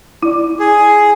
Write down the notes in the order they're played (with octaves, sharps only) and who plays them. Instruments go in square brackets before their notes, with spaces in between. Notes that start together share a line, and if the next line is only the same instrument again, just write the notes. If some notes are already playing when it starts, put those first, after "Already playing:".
[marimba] E4 D5
[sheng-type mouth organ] G#4